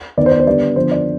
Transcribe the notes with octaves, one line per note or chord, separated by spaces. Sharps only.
D#3 B3 D5
C5
D5
C5
D3 G3 B3 D5
D3 F3 B3 C5
D5